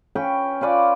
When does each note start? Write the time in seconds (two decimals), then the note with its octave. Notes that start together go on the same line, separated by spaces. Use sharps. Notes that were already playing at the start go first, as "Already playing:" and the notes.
0.15 C#4 B4 G5
0.61 C#4 F4 B4 D5